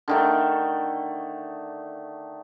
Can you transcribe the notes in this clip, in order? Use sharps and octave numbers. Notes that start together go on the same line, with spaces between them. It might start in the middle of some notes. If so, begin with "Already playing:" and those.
D3 D#3 A3